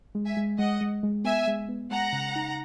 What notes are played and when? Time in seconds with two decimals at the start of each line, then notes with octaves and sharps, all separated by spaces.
0.15 G#3
0.25 E5 G#5
0.37 G#3
0.58 G#3 D#5 F#5
0.81 G#3
1.03 G#3
1.24 B3 E5 G#5
1.47 G#3
1.69 B3
1.91 G#3 F#5 A#5
2.13 C#3
2.35 D#4